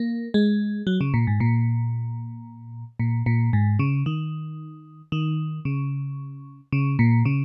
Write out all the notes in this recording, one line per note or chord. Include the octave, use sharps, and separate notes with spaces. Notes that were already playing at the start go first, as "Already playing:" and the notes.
Already playing: A#3
G#3
F#3
C#3
A#2
G#2
A#2
A#2
A#2
G#2
C#3
D#3
D#3
C#3
C#3
A#2
C#3